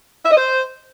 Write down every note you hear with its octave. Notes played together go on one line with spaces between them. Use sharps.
E5
D#5
C5